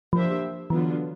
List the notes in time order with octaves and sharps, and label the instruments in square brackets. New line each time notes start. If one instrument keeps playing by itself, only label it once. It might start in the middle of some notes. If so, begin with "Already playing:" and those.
[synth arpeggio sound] F3 [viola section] A#3 D4 G4 C5 E5
[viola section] D3 F#3 B3 D4 F4 [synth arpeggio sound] E3